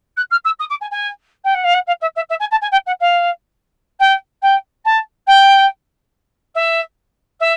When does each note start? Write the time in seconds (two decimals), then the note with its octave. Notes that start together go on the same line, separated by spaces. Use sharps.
0.17 F#6
0.31 F6
0.45 E6
0.59 D#6
0.70 D6
0.81 G#5
0.91 G#5
1.44 G5
1.54 F#5
1.64 F5
1.74 F#5
1.87 F5
2.01 E5
2.15 E5
2.29 E5
2.40 G#5
2.51 A5
2.61 G#5
2.72 G5
2.86 F#5
3.00 F5
3.99 G5
4.42 G5
4.85 A5
5.27 G5
6.55 E5
7.40 E5